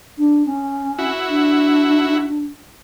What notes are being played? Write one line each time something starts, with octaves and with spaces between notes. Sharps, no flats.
D4
C#4
E4 F#4
D4